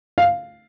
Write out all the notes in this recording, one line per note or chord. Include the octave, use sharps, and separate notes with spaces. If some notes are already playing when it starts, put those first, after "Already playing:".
F5